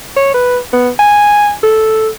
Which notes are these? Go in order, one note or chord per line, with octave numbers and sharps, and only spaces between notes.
C#5
B4
B3
G#5
A4